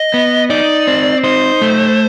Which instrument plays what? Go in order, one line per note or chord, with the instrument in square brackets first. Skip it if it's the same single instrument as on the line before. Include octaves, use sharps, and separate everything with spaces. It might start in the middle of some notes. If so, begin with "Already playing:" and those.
Already playing: [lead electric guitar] D#5
[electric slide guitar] B3
[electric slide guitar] D#4 [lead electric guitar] D5
[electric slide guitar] C4
[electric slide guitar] D#4 [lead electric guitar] C5
[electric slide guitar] A3